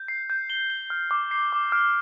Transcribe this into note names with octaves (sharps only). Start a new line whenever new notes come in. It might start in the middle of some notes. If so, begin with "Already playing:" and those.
Already playing: G6
C7
G6
G7
G7
F6
D6
C7
D6
F6